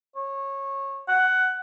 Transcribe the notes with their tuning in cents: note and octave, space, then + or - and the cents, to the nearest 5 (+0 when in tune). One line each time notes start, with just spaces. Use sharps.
C#5 -20
F#5 +10